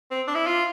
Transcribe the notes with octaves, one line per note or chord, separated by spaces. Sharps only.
C4
D4
E4
F4